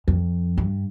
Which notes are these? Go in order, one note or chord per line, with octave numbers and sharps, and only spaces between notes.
F2
G2